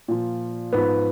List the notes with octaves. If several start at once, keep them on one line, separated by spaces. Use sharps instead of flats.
A#2 F3
G#2 F3 B3